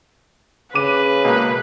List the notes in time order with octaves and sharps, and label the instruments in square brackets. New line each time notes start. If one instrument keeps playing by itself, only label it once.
[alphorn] C#3 [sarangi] B4 [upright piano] D6 D#7
[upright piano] E1 A#3